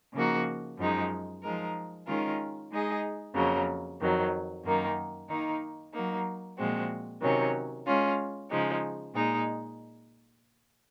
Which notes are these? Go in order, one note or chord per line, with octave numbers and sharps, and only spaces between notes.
C#3 F3 A#3 D#4 F#4
F#2 F3 G#3 D#4
F3 G#3 D#4 A#4
D#3 G#3 C#4 F4 A#4
G#3 D#4 G#4 D#5
F2 C#3 F#3 A#3
F2 D#3 F#3
F#2 D#3 A#3 D#4
D#3 A#3 D#4
F#3 A#3 D#4
A#2 F3 G#3 C4 F#4
C3 D#3 F#3 C#4
G#3 C#4 F4
C#3 F3 G#3 D#4
A#2 G#3 D#4